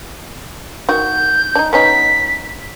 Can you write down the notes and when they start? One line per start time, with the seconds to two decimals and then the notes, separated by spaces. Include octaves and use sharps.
0.89 D#3 F#4 G6
1.55 D4 D#4
1.73 B3 C#4 D#4 B6